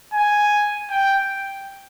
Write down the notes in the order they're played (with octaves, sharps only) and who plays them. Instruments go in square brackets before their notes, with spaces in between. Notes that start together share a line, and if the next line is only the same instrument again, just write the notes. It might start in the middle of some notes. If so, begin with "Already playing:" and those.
[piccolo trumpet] G#5
G5